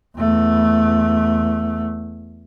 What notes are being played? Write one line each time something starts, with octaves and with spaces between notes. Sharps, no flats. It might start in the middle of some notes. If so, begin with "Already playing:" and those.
E2 A3